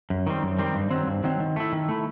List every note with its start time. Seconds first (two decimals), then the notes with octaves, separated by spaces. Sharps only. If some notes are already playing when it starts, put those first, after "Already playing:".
0.10 F#2
0.27 D#3 G3 C4
0.43 F#2
0.58 D#3 G3 C4
0.75 G2
0.91 D#3 F#3 C4
1.07 G2
1.24 D#3 F#3 C4
1.40 D#3
1.56 A3 E4
1.72 D#3
1.89 A3 E4